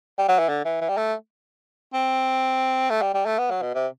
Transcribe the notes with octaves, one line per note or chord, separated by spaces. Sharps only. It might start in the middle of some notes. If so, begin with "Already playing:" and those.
G3
F#3
E3
D3
E3
E3
G3
A3
C4
A3
G3
G3
A3
B3
F#3
B2
C3